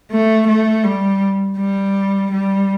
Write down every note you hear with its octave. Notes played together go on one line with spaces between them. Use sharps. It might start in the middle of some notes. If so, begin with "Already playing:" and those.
A3
A3
G3
G3
G3